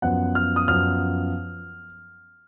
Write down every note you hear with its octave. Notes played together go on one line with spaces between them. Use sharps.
F#2 F3 B3 F#5
F6
D#6
F#2 F3 B3 F6